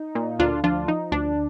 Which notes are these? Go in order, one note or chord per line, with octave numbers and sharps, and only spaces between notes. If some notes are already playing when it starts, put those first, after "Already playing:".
Already playing: D#4
A#2
D2 D4 F4
F3 D4 F4
F3 D#4
D2 D4